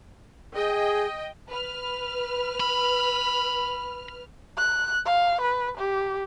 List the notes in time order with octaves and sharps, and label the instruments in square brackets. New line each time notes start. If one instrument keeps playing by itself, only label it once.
[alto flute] G#4 [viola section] D#5 G5
[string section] B4 F6
[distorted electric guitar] B5
[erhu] F#6
F5
B4
G4